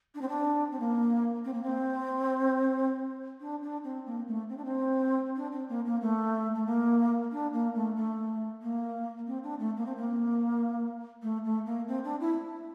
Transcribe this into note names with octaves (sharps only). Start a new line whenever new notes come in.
D4
C4
D4
C4
A#3
C4
A#3
C4
D4
D4
C4
A#3
A3
C4
D4
C4
D4
C4
A#3
A#3
A3
A3
A#3
D4
A#3
A3
A3
A#3
C4
D4
A3
A#3
C4
A#3
A3
A3
A#3
C4
D4
E4